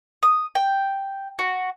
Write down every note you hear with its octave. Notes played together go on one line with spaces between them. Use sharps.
D#6
G5
F#4